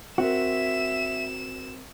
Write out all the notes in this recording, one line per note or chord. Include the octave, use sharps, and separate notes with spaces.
C4 F#4 A#4 E5 E7